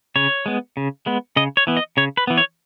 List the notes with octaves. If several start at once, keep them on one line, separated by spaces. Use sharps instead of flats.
C#3 C#5
G#3 B3
C#3
G#3 B3
C#3 D#5
C#5
E3 B3
D#5
C#3 C#5
B4
E3 B3
C#5